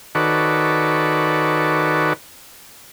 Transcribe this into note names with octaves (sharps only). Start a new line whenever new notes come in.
D#3 F#4 A4 B4 C#5 D5